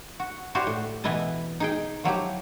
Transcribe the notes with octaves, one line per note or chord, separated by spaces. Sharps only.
F#4
E4 F#4 G4 C5 D5
A2
B2 E3 E4 B4 D#5 A5
D#4 G#4 G5
F3 F#3 E4 G4